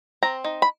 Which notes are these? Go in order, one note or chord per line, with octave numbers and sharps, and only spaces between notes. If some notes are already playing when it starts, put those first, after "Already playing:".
C4 A#5
D#4
B5